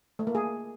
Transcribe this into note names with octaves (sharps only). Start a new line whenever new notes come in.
A3
A#3
G#4